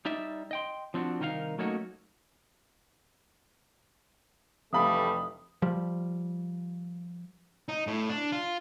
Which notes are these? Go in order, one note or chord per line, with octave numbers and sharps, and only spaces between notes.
G3 D#4 D5 E5
D#5 G5 C6
F3 C4 D4 F#4
C2 D#3 D#4 A#4 C5 F5
F#3 A3 A#3 C#4 D#4 F#4
F1 E3 G3 A3 F5 B5 D#6
F3 G3
D#4
A2
D4
F4